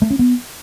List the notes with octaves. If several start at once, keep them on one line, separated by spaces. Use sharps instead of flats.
A3
C#4
B3